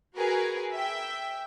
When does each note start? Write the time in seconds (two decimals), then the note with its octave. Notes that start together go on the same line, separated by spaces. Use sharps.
0.16 F#4 G#4 A#4 B4
0.72 E5 G5